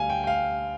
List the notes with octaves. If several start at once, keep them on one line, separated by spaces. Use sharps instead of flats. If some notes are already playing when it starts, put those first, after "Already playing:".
Already playing: D2 D3 G3 F5 G#5
G5
G5
F5